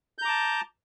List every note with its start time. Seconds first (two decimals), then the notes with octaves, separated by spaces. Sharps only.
0.18 G6
0.22 A#5
0.25 D6
0.28 A5